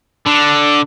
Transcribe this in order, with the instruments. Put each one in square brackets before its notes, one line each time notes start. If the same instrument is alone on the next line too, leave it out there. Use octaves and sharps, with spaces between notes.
[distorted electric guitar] D3